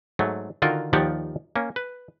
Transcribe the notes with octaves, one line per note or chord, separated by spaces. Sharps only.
G#2 F#3 A3
D3 D#3 F4 F#4 A#4
D#2 D#3 F3 G4 D5 F#5
A#3 C#4
B4